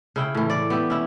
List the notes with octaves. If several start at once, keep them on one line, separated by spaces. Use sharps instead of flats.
C#3 E4 G5
A2 E3
D5
B3 G4 E5
C#4 E4